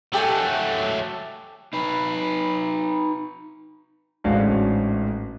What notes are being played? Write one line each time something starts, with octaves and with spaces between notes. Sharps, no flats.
F#3 A3 G4 A4 G#5
D#4 B4
A1 G#2 C#4 D4 F#4 F5